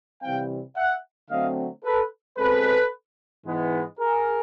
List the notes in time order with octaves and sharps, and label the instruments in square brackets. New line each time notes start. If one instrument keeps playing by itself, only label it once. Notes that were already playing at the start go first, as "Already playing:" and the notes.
[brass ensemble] C3 E3 G3 C4 F5 G5
E5 F#5
D3 F#3 A3 C4 D#5 F5
A4 B4
B2 G#3 C4 A4 B4
G#2 E3 G#3 B3
G#4 A#4